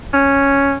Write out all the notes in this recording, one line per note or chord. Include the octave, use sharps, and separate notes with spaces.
C#4